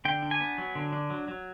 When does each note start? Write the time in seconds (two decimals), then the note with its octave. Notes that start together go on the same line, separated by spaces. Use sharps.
0.05 D3 G5
0.23 D4
0.31 G#5
0.40 B3
0.58 F#3
0.75 D3
0.93 D4
1.10 F#3
1.28 F#3